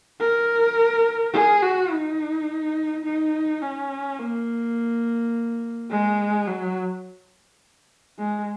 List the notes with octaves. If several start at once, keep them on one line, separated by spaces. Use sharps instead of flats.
A#4
G#4
F#4
D#4
D#4
C#4
A#3
G#3
F#3
G#3